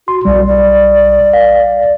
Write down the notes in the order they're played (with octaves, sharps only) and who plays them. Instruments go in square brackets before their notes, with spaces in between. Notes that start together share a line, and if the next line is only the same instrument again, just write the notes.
[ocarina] F#4 [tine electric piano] C6
[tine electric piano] B1 G3 [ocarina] D5
[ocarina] D5
[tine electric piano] F5